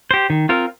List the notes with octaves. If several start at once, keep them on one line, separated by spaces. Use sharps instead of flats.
G4 C5
D#3
C4 F4 A#4